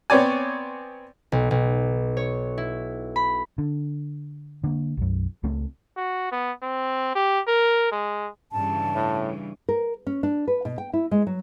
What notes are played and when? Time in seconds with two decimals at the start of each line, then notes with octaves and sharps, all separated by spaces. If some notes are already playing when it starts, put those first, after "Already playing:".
0.10 B3 C4 C#5 D5 G#5
1.32 B1
1.51 B1
2.17 C#5
2.58 E4
3.16 B5
3.58 D3
4.64 D3 A#3
4.97 B1 F#2
5.43 C#2 A3 C4
5.97 F#4
6.32 B3
6.62 C4
7.15 G4
7.47 A#4
7.92 G#3
8.52 G2 C#3 E3 A5
8.95 A2
9.69 A#4
10.07 C#4
10.23 D4
10.47 B4
10.65 B2
10.78 G5
10.93 E4
11.11 G#3
11.27 F#3